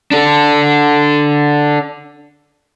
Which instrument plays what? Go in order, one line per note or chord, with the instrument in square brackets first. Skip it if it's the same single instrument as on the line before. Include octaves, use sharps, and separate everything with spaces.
[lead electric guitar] D4 A4